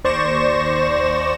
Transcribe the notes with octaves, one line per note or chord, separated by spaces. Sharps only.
D#2 C5 D5 C#6 A#6 E7